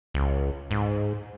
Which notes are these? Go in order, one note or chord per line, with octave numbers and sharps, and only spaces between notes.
C#2
G#2